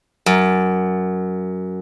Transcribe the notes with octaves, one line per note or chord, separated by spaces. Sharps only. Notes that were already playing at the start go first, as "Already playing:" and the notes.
F#2